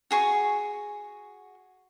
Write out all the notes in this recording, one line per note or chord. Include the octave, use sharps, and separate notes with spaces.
F#4 G#4 C#6